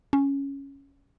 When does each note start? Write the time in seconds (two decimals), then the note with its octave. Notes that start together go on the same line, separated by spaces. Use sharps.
0.13 C#4